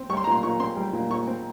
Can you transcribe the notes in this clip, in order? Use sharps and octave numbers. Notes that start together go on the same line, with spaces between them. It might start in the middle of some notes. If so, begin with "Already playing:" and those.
Already playing: C4
G3 C#6
C6
A#5
A#2 C6
A#2 C#6
C4 C6
G3
A#2
A#2 C#6
C4